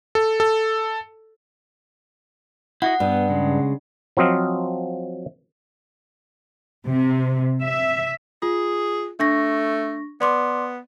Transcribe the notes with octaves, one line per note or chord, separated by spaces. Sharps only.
A4
A4
E4 F#4 D#5 F#5
G2 B3
C#3 G#3
F3 F#3 C4 D#5 F5
C3
E5
F4 G#4
A3 D4 C#6 A#6
B3 D5 C6 D6